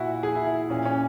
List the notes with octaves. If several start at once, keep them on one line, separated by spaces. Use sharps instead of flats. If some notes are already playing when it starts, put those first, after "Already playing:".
Already playing: A#2 E4 F#4
G#4
E4
E4
A#2 C#4
C#4